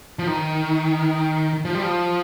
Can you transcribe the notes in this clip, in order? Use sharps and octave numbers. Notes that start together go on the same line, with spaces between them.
F3
D#3
F3
G3
F3